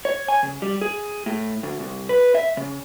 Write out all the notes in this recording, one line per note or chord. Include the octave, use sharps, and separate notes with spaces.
C#5
G#5
C#3
G3
G#4
A2
D2
C2
B4
E5
C#3